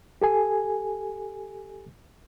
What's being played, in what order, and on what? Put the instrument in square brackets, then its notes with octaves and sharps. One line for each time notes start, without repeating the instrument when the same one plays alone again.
[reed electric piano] G4 A4 G#5